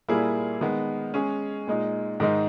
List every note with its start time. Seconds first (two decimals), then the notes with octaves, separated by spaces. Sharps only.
0.09 A#2 G3 A#3 E4 G#4
0.61 D#3 G#3 B3
1.14 G#3 C#4 G#4
1.68 A#2 G#3 D#4
2.20 G#2 D#3 G#3 D#4